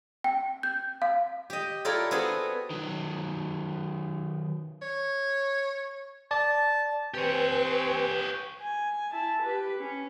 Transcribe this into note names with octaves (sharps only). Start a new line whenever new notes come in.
G5
G6
F5
G4 D#5
E4 F4 A4 A#4 C#5 D5
B3 C4 F#4 G#4 A4
D#3 F#3
C#5
D5 A5
C4 G4 B4 C#5 G#5
G#5
E4 A5
G4 B4
C#4